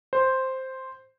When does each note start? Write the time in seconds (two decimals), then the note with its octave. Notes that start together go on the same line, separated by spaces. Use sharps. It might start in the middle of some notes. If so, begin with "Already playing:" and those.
0.13 C5